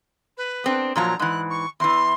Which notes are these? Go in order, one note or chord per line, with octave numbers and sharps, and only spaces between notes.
B4
B3 C4 D4
A#2 F3 F#3 A#5
G#2 E3 F#6
C#6
E2 E3 C6